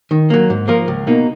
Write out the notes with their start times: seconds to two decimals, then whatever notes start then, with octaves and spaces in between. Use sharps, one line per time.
0.11 D#3
0.30 F#3 A#3
0.50 G#2
0.68 F3 A#3 F4 A#4
0.88 C#2
1.07 B2 A#3 D#4